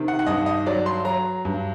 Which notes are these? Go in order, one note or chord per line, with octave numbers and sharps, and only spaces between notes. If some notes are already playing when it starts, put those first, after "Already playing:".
Already playing: C3 D#3
F#5
F#5
G2 D#5
D#5
F#3 D5
C6
F#3 A#5
G2